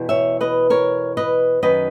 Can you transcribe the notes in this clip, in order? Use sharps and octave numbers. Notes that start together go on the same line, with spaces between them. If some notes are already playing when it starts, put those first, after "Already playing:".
Already playing: E2 B2
C#5 E5
B4 D#5
A#4 C#5
B4 D#5
F#2 D#3 B4 D#5